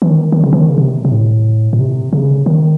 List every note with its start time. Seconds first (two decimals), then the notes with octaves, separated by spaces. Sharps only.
0.02 E3
0.10 D#3
0.32 D#3
0.44 C#3
0.53 E3
0.61 D#3
0.70 C#3
0.78 C3
1.05 C3
1.12 A2
1.73 A2
1.79 C3
2.13 C#3
2.46 D#3